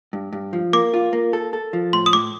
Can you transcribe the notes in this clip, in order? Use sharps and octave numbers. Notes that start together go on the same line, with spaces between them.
G2
G2
F3
A#3 D6
F4
A#3
A4
A4
F3
A2 C6
D#6
A2 D6